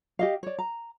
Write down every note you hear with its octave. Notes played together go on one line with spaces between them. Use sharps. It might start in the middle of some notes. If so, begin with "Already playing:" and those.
G4 D#5 F5
C#5 D5
A#5